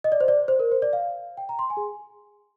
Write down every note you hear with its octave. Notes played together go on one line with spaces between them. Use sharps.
D#5
D5
C5
D5
C5
A#4
C5
D5
F5
G5
A#5
C6
G#5
G#4